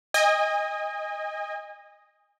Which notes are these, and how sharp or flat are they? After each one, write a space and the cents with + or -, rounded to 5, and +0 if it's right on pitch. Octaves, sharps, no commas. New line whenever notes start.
D#5 +0 G#5 -35